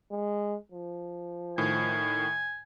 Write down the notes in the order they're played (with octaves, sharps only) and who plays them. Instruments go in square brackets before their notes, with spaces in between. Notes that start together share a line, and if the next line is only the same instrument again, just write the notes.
[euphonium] G#3
F3
[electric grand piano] A2 D#3 [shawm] G#5